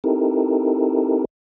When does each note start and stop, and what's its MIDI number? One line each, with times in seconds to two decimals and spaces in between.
0.04 1.25 60
0.04 1.25 63
0.04 1.25 64
0.04 1.25 67
0.04 1.25 69
0.04 1.25 70